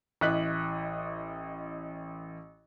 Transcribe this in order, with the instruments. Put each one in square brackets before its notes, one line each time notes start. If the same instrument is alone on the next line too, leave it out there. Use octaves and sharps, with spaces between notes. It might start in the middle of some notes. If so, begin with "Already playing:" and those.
[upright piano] A1 E4 D#5 F#6 B6 F#7